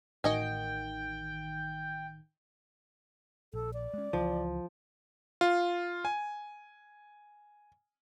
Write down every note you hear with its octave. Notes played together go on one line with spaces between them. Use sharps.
A1 D#3 F#4 D#5 G5 G#5
A#1 A4
D5
G#3 C#4
C#2 E3 F3
F4
G#5